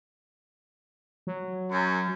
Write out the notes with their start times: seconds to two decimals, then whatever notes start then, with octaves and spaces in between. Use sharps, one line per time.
1.27 F#3
1.71 F#2